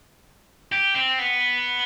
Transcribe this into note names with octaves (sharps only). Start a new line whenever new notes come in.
G4
C4
B3